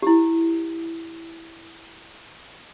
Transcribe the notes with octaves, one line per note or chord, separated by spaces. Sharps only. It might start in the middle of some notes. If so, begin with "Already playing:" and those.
E4 G4